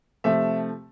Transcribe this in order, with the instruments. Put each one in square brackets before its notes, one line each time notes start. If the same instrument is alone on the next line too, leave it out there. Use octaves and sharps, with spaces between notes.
[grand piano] C3 F3 A3 E5